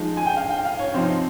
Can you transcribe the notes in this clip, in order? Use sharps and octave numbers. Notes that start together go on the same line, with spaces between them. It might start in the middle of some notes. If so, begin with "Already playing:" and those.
Already playing: F3 G#3 D#4
G#5
G5
F5
G5
F5
C#5
C3 F3 C4 D#4 C5